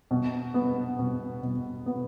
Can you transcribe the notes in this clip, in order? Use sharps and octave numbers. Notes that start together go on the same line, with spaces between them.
B2
B3
B2
B2
B3